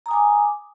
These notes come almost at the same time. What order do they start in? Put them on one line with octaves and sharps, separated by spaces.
A#5 D#6 G#5 D6